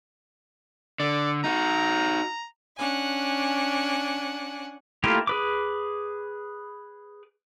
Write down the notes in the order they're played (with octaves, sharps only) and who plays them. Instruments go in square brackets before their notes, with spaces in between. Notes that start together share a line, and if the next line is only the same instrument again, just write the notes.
[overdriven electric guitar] D3 [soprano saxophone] D5
[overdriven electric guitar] D#4 F#4 [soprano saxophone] A#5
[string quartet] C#4 D4 F#5 G#5
[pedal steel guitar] A3 A#3 E4 F4 G4
G#4 B4 D6